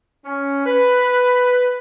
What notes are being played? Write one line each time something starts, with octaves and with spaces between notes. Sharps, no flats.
C#4
B4